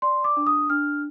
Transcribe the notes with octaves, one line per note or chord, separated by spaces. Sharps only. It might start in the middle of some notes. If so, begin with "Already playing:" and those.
D5 C6
D6
D4
D#6
D4 F6